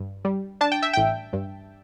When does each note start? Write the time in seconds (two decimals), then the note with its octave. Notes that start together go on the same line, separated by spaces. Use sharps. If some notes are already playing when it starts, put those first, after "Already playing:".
Already playing: G2
0.25 G3
0.61 D4 A5
0.72 G5
0.83 E5
0.93 A1 G5
1.33 G2